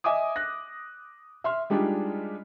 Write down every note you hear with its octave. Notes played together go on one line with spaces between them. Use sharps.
D#5 E5 G#5 D6 D#6
F#6 A#6
E5 C6 F6
G3 G#3 D4 D#4 F4 G4